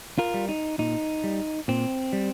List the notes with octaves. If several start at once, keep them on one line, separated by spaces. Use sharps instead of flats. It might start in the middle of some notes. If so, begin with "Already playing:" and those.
F4 A#4
G3
D#4
A#2 D#4
G3
A#2 C4
G3